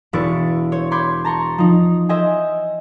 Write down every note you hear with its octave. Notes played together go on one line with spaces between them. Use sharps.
E1 E4 B4 C#6 A6 D7
C5 C#5
B5 C6 D6 G6 G#6
A5 A#5 C6 C#6
F3 D#4
C5 D#5 E5 G5 G#5